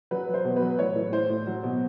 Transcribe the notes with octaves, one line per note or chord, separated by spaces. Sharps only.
F#3 B4
F#3
C5
B2
B4
F#3
A2 C#5
A2
E3 C5
A2
F#3
B2